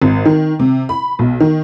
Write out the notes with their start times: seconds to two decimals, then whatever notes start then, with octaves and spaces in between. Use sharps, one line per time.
0.02 G#1
0.25 D#3
0.59 C3
0.89 B5
1.19 B1
1.40 D#3